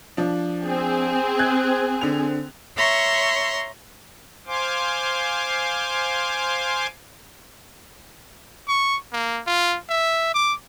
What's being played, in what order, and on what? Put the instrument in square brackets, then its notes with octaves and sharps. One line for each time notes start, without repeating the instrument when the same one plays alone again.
[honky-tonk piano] F3 D4
[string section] C4 G#4
[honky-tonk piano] F#6 G#6
D3 F7
[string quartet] C#5 E5 A#5 C6 C#6
[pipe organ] C5 F5 G#5 C6 D6
[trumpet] C#6
A#3
F4
E5
D6